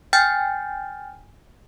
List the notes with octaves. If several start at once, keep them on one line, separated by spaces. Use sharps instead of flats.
G5 G#5 F6 G6 A6